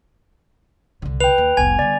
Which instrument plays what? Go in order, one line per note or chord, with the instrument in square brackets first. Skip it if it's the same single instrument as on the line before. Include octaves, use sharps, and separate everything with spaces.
[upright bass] C2 D3
[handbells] B4 G5 [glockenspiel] F7
[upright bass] D#2
[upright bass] F1 C2 [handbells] B3 G#6 [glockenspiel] G#5
[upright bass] D3 G3 [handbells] D5